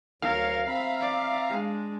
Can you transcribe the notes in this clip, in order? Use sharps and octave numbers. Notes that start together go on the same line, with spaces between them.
D2 F#3 A#4 C#5 F5
C4 E5 A#5 B5
D5
G#3 D4